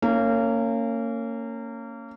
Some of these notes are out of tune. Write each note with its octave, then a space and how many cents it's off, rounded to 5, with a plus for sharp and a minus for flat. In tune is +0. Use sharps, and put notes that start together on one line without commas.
A#3 -30 C#4 +0